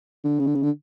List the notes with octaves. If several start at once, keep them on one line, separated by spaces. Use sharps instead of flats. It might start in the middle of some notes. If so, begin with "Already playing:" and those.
D3
C#3
D3
C#3
D3